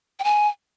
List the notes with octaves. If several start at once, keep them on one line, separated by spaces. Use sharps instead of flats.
G5
G#5